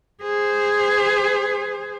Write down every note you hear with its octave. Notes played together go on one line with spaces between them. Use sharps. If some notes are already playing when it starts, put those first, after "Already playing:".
G#4 C5